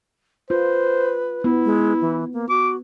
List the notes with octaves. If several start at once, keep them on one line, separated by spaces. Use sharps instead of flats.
F4 B4 C5
B3 E4
G#3
E3
A#3
F#4 D6